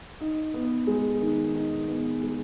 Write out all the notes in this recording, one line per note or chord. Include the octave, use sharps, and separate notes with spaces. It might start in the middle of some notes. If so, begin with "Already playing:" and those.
D#4
B3
G#3
D#3
D#4
B3
G#3